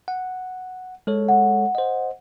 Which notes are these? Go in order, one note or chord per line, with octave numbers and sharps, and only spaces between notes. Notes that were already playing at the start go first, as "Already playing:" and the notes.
F#5
G#3 A4 C#5
F#5
C5 D#5